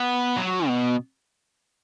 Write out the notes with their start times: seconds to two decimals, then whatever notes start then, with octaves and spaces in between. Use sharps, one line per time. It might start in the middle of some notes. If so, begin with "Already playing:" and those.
Already playing: B3
0.36 F#3
0.67 B2